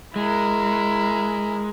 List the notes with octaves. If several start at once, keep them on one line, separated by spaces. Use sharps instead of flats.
G#3 E4 A#4